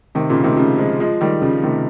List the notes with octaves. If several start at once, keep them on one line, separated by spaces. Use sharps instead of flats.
C3 D#3
A#2 C#3
C3 D#3
C#3 F3
F3 G#3
F3 G#3
D#3 G3
C#3 F3
C3 D#3